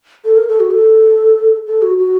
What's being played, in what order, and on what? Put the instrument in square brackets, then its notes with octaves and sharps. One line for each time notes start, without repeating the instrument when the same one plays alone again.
[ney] A4
A#4
A4
F#4
A4
A4
F#4
F#4